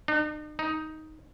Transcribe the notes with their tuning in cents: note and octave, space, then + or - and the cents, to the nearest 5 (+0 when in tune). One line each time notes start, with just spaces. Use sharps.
D#4 -45
D#4 +10